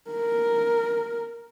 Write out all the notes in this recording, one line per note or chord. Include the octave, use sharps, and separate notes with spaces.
A#4